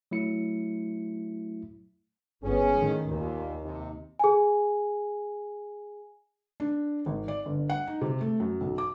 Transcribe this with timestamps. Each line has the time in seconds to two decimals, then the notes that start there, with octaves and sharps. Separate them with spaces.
0.11 F#3 A3 E4 C#7
2.43 G1 B3 C#4 G#4
2.76 A2 D#3
3.09 D#2 A#2
3.64 C3 D#4
4.19 G#4 G#5
6.60 D4
7.06 G#1
7.28 D5
7.46 G1
7.69 F#5
7.87 D#4
8.01 C3
8.21 A3
8.40 F#2
8.61 B1
8.78 D6